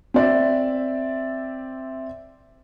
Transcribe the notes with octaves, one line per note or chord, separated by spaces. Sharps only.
C4 D5 E5